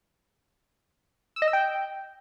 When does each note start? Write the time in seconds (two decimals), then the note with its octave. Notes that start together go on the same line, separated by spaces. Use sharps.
1.36 E6
1.42 D#5
1.48 E6
1.53 G5